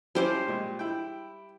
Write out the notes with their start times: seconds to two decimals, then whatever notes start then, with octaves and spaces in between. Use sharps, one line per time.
0.15 F3 G3 C#4 E4 C5 D6
0.48 A#2 G#3
0.79 E4 G5